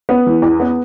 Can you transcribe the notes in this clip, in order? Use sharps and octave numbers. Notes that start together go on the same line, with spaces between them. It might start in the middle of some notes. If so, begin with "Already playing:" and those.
B3 B4
E3
E2
B3